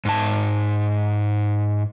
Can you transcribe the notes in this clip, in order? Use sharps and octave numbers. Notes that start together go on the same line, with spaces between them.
G#2 A5